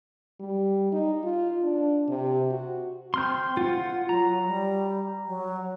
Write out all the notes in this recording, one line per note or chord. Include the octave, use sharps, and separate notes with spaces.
G3
D#4
F4
D4
C3
F#4
C4 C6 F6 G6
F4 F#5
F#3 A#5
G3
F#3